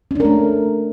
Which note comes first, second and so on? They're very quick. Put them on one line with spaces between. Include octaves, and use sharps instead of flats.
C#4 D4 A#4 A3